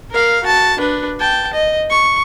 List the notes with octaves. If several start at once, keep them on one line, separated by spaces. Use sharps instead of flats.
A#4 F5
F#4 A5
D4 B4
G5 A5
D#5
C#6